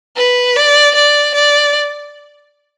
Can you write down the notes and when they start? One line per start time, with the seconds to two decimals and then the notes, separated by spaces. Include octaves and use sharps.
0.16 B4
0.56 D5
0.95 D5
1.35 D5